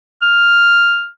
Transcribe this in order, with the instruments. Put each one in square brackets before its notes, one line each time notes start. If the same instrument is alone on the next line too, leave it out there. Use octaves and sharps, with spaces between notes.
[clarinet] F6